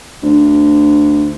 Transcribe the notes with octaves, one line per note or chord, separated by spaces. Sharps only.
D2